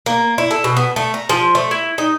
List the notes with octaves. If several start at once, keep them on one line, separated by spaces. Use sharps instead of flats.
A#3
E4
A4
B2
B3
A3
A#5
F3
A3
E4
D#4